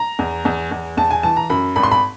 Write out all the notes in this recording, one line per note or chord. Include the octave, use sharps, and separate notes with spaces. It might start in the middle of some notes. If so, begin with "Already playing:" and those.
Already playing: A#5
E2
E2
E2
E2 A5
G#5
E3 A5
A#5
F#2 B5
G#1 B5
C6
B5